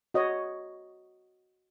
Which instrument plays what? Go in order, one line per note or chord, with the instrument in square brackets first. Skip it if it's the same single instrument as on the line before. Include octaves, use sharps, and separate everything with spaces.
[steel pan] F#4 C#5 D#5